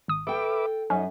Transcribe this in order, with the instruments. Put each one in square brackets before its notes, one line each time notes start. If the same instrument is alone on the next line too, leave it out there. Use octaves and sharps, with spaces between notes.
[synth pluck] G#1 D#6
[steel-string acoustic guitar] A4 G5 [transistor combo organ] B4 E5 D6
[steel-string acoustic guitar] F#2 [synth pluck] C#4 [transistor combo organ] D#4